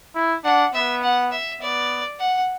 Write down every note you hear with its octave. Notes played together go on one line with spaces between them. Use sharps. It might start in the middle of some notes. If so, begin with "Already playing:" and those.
E4
D4 F#5
B3 E5
F#5
E5
B3 D5
F#5